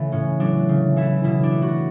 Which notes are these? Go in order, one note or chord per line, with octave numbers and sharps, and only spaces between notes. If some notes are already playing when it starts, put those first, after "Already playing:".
Already playing: C#3 E3 A3
A2 C#4
F#3 A3 D4
C#3
E3 A3 E4
B2 E4
D4
A3
F#4